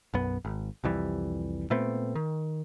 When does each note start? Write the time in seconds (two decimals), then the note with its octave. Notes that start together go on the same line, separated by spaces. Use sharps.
0.14 B1 F#2 B3
0.45 G#1
0.84 C2 F2 E3 G3
1.70 A#2 A3 B3 C4
2.15 D#3